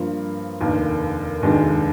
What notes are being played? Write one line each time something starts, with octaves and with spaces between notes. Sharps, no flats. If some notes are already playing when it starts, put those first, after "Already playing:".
Already playing: G2 F3 A#3 F4
F1 D#2 D#3 A#3 D4
F1 D#2 D#3 G#3 D4